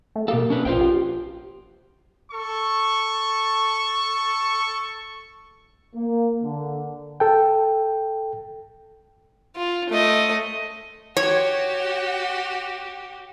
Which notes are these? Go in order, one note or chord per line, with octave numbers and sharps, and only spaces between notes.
A3
B2 A#3 G4 A4
C#4 D4 B4
A#1 F4 C5 G5
G4
A4 C#6
A#3
D3
A4 G5
F4
A3 D#5
F#4 G4 C#5